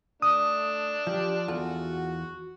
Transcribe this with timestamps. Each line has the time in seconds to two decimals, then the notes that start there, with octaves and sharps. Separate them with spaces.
0.22 A3 D4 D#6
1.07 F3 G4
1.48 E2 F4 F#4 A4